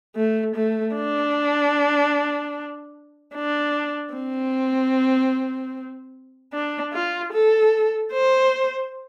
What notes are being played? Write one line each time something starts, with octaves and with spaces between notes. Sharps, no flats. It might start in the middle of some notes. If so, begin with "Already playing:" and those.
A3
A3
D4
D4
C4
D4
F4
A4
C5